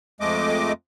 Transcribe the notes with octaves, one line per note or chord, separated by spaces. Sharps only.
F2 G#3 A3 D#5 D6